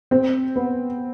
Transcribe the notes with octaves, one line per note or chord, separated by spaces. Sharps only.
C4
B3